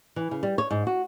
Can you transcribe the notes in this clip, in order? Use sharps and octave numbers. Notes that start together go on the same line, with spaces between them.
E3
C#3
G3
C#5
G#2
F#4